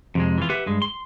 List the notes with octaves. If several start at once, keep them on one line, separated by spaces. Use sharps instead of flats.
F2 C3 G#3
E3 F4
G4 B4 E5 F#5
G2 G#3
C6